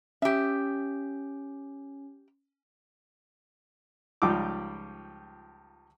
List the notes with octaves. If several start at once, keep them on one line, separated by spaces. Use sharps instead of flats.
C#4 G4 E5
C#2 F3 G3 D#4 G4 D6